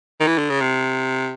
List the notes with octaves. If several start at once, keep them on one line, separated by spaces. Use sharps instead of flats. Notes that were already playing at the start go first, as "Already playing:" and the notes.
D#3
E3
D3
C#3
C3